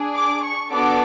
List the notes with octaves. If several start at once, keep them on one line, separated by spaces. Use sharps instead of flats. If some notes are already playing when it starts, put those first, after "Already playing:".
Already playing: D4 G#4
D6
C#6
B3 D4 F#4 A4 D6